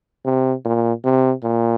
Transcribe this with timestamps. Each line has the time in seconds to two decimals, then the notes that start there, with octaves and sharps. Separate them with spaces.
0.25 C3
0.65 A#2
1.04 C3
1.44 A#2